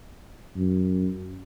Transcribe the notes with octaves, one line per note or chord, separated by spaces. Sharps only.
F#2